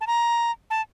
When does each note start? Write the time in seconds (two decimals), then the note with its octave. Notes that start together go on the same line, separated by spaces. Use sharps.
0.01 A5
0.07 A#5
0.70 A5